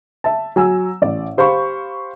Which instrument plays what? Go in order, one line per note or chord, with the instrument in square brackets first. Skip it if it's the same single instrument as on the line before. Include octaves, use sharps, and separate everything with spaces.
[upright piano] E5 A5
F#3 G#5 E6
A1 D5
G4 C5 F5 B5 C#6